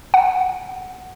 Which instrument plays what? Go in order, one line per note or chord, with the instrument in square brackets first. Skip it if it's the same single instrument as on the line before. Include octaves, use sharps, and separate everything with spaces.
[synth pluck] F#5